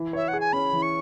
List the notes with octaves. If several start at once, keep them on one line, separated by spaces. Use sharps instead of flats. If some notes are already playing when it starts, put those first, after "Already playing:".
Already playing: E3
C#5 E5
F#5
G#4
G#5
C#4 B5
E3
C#6